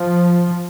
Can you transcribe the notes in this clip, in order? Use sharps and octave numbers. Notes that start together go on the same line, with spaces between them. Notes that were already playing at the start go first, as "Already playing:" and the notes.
Already playing: F3